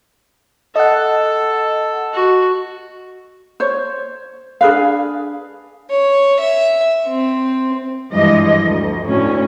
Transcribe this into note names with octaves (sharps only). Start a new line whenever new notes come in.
A4 D#5 F#5
F#4
C5 C#5
D4 G#4 B4 F5
C#5
E5
C4
G2 E3 F3 G#3 D#5
D2
D2 A2 C#4